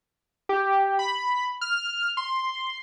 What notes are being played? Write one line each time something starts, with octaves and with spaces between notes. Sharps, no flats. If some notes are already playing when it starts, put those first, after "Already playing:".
G4
B5
F6
C6